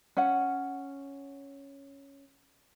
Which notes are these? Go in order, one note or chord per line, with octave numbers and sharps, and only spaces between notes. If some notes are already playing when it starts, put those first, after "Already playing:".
C#4 F#5